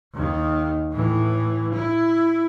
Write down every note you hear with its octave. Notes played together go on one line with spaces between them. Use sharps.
D#2 D#3
A2 E3
E4